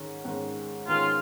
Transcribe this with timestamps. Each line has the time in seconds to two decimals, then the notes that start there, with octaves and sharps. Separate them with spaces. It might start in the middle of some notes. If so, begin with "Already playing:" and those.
Already playing: G#2 D#3 G#3 C#4
0.25 G#2 D#3 G#3 C#4
0.88 G#2 D#3 G#3 C#4 F4